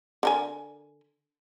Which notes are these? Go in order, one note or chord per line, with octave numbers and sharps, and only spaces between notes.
D3 A#4 G#5